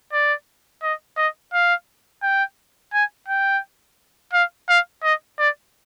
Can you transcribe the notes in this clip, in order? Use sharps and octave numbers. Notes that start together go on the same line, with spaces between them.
D5
D#5
D#5
F5
G5
G#5
G5
F5
F5
D#5
D5